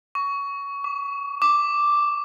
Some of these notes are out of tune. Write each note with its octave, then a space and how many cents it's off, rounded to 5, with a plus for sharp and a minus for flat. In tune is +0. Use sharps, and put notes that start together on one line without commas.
C#6 +20
D6 -30
D6 +0